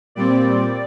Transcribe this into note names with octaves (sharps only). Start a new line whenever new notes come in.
A#2 G3 C4 D5